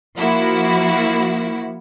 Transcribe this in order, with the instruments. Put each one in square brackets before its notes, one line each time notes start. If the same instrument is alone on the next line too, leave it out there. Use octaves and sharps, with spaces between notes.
[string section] F3 A#3 E4 F#4